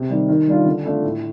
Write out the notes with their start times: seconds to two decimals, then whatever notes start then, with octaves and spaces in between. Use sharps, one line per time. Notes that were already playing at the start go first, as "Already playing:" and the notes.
Already playing: C3
0.10 D#3 G3
0.28 D#3
0.48 G3 D4 F4
0.65 D3
0.85 A3 D4 F4
1.04 A2